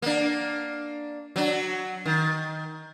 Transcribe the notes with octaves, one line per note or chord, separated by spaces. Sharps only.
A#3 D4
F#3 D4
D#3